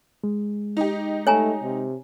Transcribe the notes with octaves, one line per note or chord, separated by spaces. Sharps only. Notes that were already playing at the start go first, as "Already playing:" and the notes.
G#3
D#4 G4
A3 C#5 G#5 A#5
C3